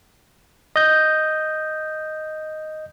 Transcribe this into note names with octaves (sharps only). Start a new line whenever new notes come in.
D#5 G6